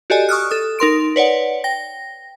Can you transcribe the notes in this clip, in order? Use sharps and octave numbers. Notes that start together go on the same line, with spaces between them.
F#4 G4 A4 D5 D#5 G#5
C#6 D#6 F6 F#6
A4 D#6
D#4 A#4 C6 D7
B4 C#5 D5 F#5
G5 A#6